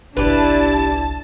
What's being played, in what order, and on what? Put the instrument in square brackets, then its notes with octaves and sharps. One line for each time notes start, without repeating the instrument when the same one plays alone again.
[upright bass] G1 C2 [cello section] D4 E4 [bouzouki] G4 B4 [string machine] A5